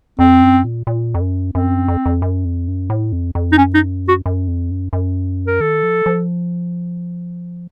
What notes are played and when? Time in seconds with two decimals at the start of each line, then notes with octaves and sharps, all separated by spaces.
0.19 F2 C4
0.42 F#2
0.64 A#2
0.87 A#2
1.14 F2
1.20 F#2
1.54 F#2 C4
1.88 F2
2.06 F2
2.22 F#2
2.45 F2
2.68 F#2
2.90 A2
3.12 F2
3.35 F2
3.52 D#4
3.58 F#2 C#4
3.74 D#4
4.08 F#4
4.26 F#2
4.48 F2
4.71 F#2
4.93 F#2
5.47 A#4
5.60 D#3 A4
5.83 F3
6.06 F3